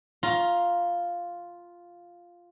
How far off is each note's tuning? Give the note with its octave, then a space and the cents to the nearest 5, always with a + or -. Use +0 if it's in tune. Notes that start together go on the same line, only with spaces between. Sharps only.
F4 +0 A#5 +20